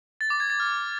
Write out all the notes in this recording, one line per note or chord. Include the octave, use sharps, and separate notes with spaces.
A6
D6
G#6
A6
F6